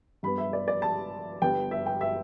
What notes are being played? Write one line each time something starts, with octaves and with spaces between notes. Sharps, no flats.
G2 G3 B3 B5
E5
D5
D5
A5
G1 G2 G3 B3 G5
E5
G5
E5